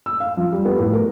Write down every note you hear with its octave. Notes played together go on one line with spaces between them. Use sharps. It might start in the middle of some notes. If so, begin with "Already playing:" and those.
E6
F5
F3
G3
B3
A2
A#4